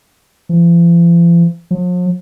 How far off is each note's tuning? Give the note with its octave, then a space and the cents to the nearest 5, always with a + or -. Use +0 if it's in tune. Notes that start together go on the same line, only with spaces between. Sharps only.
F3 -45
F3 +45